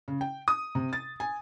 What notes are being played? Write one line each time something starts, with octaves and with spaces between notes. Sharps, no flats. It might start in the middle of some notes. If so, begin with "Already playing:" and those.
C#3
G5
D#6
C3
A6
G#5